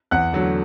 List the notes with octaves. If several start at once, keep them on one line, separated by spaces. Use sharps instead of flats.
E2 F#5 F#6
D3 F#3 A3